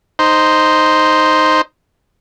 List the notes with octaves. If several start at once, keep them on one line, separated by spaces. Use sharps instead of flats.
D#4 C5